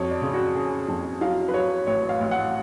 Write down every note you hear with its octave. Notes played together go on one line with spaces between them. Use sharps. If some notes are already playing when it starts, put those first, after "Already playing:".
Already playing: F2 F#3 C#5
D5
C#3
F#4
C#3 G#4
F2
F#3 F5
B4
F#3 C#5
A1 C#5
F5
A1
F#5